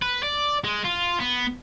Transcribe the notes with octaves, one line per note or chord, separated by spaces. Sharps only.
B4
D5
G#3
F4
B3